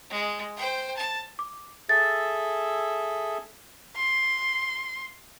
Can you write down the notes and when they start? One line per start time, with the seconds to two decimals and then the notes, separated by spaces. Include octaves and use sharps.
0.10 G#3
0.57 C5 G5
0.97 A5
1.39 D6
1.89 G#4 A4 E5 A6
3.96 C6